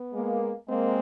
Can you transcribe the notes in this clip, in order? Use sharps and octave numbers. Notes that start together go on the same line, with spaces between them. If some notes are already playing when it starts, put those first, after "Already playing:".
Already playing: B3
G#3 A#3
G#3 A#3 C4